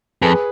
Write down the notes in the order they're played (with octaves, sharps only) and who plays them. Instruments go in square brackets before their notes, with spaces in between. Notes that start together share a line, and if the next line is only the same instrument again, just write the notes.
[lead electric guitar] F2 [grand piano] G#4 B4